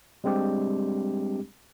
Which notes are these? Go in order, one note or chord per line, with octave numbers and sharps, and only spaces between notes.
G3 G#3 C4 D4 G4